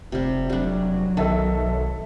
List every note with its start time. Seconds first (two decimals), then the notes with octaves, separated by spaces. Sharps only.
0.12 F1 C3 G3
0.50 F#3 G3 D4
1.17 B1 D#3 A4 E5 A5